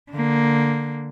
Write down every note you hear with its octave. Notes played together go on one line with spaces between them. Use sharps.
D3 A#3